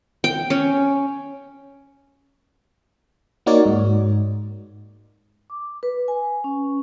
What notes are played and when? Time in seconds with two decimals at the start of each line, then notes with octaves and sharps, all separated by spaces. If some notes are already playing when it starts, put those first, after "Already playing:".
0.24 G5
0.50 C#4
3.46 A#3 D#4 F#4 A#4 C#5 D5
3.66 G#2
5.50 D6
5.83 B4
6.08 G#5
6.44 C#4